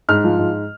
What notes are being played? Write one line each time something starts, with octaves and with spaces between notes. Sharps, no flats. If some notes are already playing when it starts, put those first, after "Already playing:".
G#2 F6
F3
G#2